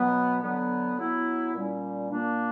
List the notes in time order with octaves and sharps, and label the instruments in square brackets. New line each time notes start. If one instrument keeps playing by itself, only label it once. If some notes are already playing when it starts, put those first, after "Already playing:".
Already playing: [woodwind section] B2 F#3 B3
D3 F#3 B3
F#3 B3 E4
A#2 G3 C#4
A#2 A#3 D4